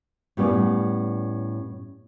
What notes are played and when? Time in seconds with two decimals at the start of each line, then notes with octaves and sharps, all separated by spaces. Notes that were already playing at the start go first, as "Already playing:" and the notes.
0.37 A2 G3 B3 C#4 D5